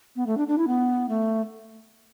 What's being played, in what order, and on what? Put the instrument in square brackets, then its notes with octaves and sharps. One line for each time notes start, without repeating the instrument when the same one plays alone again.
[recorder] B3
A3
D4
D4
E4
B3
A3